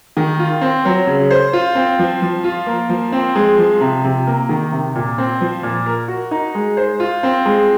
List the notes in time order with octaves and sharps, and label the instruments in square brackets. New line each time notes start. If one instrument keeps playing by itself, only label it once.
[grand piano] D#3
F4
C4
F#3
C#3
C5
F4
C4
F3
F3
F4
A#3
F3
C4
G#3
F3
C3
C3
A#3
D#3
C3
A#2
C4
F3
A#2
A#4
F#4
D#4
G#3
C5
F4
C4
G#3